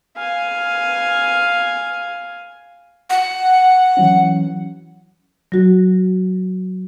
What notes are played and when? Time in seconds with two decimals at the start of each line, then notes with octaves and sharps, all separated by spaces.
0.17 F5 G#5
3.10 F#5
3.97 E3 F#3 C#4
5.52 F#3 F#4